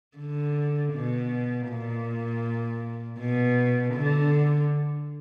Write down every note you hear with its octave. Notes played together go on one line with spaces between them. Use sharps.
D3
B2
A#2
B2
D3